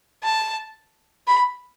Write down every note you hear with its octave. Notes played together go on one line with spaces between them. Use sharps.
A5
B5